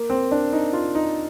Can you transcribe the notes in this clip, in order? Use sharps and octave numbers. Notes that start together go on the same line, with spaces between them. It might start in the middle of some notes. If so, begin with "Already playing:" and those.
Already playing: A#3
C4
D4
D#4
F4
D#4